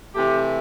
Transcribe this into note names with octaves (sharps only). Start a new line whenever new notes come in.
C3 E3 A3 G4